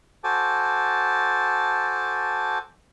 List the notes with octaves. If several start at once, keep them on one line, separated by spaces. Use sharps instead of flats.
F#4 A4 C5 G#5 A5 D6